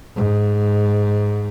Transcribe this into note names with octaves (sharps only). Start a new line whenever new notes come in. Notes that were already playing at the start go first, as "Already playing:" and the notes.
G#2